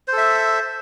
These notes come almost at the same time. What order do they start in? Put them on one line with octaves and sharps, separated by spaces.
C5 A4 E5